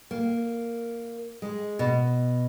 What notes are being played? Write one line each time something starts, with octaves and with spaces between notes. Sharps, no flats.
A#3
G#3
B2